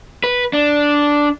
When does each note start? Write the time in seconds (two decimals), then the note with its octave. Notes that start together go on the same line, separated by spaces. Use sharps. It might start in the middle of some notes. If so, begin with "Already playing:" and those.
0.24 B4
0.53 D4